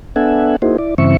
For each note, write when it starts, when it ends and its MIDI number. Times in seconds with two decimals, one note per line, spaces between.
0.16 0.56 59
0.16 0.56 62
0.16 0.56 69
0.16 0.56 76
0.16 0.56 78
0.16 0.56 80
0.62 0.77 58
0.62 0.77 63
0.62 0.77 64
0.62 0.77 66
0.62 0.77 68
0.62 0.77 72
0.78 0.95 64
0.78 0.95 74
0.98 1.17 43
0.98 1.17 49
0.98 1.17 52
0.98 1.17 60
0.98 1.17 76
0.98 1.17 85